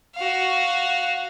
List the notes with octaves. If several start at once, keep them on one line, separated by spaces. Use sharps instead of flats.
F#4 F5